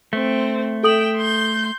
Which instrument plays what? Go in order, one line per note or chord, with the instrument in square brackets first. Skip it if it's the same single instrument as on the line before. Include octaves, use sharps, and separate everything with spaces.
[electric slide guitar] A3 [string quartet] C4
[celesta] A4 D#6 F#7 [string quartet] E5 G5
[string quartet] C6 G6